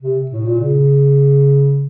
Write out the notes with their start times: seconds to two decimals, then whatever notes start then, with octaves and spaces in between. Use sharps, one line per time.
0.02 C3
0.31 A2
0.45 A#2
0.60 C#3